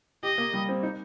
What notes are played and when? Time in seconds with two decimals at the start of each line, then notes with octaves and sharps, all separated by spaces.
0.23 G4 D#5
0.38 A#3
0.54 G3
0.69 C4
0.83 D#4